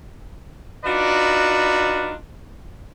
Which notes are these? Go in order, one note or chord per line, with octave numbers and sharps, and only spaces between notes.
D4 D#4 F4 F#4 B4 D5